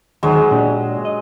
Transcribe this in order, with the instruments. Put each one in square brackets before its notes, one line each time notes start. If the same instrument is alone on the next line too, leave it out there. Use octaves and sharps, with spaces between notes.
[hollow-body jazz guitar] D#2 D#3 [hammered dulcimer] F#3 G#3 C5
[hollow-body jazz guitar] A#2 D4 G4
D#5